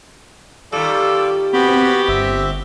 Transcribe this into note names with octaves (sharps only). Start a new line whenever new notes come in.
D#3 G3 F4 A4 D5
B3 C4 F#4 G4 B5
G1 C4 E5